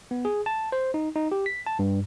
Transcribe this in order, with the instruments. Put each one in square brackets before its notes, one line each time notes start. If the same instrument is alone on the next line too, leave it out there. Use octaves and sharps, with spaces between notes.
[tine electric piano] B3
G#4
A5
C5
D#4
D#4
G4
B6
A5
G2